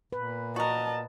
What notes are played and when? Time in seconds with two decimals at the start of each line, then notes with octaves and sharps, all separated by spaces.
0.12 A#2 B4
0.56 F#4 A#4 D#5 A5